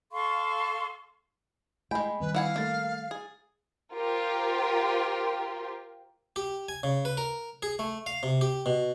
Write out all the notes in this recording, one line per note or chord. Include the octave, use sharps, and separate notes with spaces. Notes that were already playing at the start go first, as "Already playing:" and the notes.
A4 F5 C6 C#6
G#3 A3 D#5 G5 G#5 B5
D#3 G3 C4 B4
E3 F5 F#5 G#5
A3 A#3 A6
G#4
F4 G4 A#4 C5 G5
G4
G#5
C#3
B4
A#4
G#4
A3
F5
C3
G4
B2